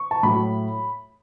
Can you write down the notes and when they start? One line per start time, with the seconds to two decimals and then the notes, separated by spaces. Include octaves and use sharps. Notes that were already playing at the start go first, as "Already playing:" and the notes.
Already playing: C#6
0.11 A5
0.23 A2 F#3 A3 B5